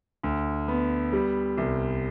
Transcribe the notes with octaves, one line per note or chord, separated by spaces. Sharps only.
D2
B3
G3
C2